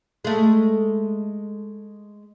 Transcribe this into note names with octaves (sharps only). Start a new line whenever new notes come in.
G#3 A3